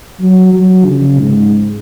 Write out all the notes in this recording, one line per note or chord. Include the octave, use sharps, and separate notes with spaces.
F#3
F#3
C#3
G#2